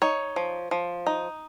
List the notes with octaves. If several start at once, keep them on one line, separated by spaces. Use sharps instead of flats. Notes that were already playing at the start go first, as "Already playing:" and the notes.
D#4 C#5
F3
F3
D#4